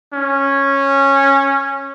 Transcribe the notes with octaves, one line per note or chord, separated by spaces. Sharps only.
C#4